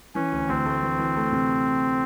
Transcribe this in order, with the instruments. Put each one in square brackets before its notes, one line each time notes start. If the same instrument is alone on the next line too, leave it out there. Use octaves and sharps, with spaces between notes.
[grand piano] E3 [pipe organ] C#4
[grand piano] D2
[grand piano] D2 [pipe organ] C4
[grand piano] A3
E3
E3
A3
C3